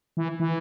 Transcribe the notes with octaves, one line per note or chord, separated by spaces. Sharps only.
E3
E3